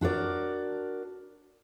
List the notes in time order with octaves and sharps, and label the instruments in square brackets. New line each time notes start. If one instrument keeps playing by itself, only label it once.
[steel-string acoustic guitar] D4 F#4 A#4 D5